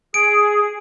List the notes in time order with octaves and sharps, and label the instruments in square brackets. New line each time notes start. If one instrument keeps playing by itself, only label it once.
[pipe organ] G#4 [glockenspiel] D7